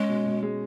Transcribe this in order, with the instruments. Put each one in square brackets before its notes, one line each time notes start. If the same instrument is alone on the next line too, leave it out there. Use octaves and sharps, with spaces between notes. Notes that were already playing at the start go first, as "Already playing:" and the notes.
Already playing: [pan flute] G#3 [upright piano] C#4
[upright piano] B2
B2
G#3